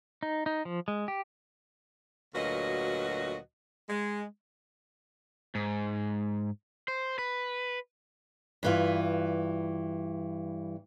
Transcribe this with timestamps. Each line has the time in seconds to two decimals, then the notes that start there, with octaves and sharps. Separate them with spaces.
0.23 D#4
0.46 D#4
0.65 F3
0.88 G#3
1.08 G4
2.35 D2 A#2 F#3 F#4 B4 D#5
3.89 G#3
5.55 G#2
6.88 C5
7.19 B4
8.63 G2 E3 F4